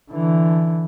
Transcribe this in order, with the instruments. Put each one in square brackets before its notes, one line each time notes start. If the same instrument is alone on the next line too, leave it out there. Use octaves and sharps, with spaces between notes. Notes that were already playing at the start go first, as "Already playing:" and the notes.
[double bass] D3 E3